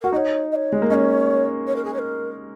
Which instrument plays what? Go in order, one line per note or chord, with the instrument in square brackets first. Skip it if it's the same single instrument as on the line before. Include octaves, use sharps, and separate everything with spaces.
[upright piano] F#4 [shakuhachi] A#4
[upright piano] D#4 [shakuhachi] D#5
[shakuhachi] C#5
D#5
C#5
[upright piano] G#3
A#3
[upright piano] C#4 [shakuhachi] C#5 D#5
[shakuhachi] C#5
A#4
G#4
C#5
A#4